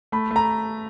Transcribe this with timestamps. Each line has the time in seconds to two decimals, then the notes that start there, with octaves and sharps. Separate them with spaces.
0.12 A3 B5
0.31 A3
0.36 A#5